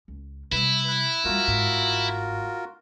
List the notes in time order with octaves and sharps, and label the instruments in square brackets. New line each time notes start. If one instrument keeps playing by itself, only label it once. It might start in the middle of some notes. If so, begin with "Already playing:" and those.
[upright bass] C#2
[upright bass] C3 G3 [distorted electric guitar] E4 [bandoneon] B4 B5
[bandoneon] B5 F#6
[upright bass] G3 G#3 [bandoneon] F4 F#4 A#4
[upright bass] G1 G#2